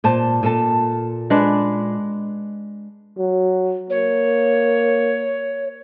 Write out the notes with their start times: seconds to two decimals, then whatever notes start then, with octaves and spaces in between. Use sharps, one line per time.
0.04 A#2 C5 A5
0.43 A#2 A4 A5
1.30 G#3 D4 B4
3.18 F#3
3.90 A#3 C#5